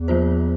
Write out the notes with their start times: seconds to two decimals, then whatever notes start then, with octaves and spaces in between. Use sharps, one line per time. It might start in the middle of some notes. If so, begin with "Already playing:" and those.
Already playing: E2
0.08 F3 A#3 F4 C5